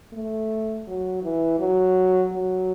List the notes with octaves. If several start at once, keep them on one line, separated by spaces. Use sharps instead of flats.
A3
F#3
E3
F#3
F#3